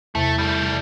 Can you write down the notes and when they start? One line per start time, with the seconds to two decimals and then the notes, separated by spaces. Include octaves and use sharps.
0.15 E2 C3 A3
0.38 G3 A3 B5